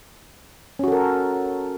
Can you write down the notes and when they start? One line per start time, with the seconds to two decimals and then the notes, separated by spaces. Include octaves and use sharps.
0.79 C#4
0.84 F#4
0.88 A4
0.92 A#4